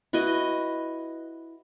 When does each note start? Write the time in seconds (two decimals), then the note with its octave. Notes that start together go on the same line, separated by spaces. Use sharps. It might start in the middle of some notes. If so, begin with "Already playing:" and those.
0.13 E4 F#4 B4 D#5